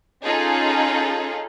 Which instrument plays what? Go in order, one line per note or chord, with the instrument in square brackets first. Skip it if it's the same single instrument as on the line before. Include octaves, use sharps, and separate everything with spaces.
[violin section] C#4 D#4 F4 G#4 A4